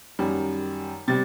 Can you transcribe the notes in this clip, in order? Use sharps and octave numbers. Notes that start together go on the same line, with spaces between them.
F#2 D#3 G3
C3 G3 A6